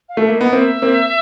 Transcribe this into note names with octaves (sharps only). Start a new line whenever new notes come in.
F5
A3
E5
A#3
B3 D#5
A#3 C4 E5
A#3 C4